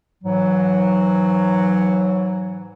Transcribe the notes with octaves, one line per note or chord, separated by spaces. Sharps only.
G#2 E3 F#3